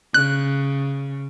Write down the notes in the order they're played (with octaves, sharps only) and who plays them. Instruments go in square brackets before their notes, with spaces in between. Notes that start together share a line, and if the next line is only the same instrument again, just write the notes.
[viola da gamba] C#3 [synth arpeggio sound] F#6